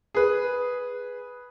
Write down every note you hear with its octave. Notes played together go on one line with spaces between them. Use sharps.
G#4 B4